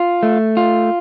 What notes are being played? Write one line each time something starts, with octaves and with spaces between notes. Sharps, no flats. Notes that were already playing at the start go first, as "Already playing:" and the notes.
Already playing: F4
A3
F4